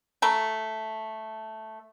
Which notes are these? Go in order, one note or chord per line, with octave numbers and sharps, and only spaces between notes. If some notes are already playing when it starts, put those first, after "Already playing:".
A3 F#4 A4 A#5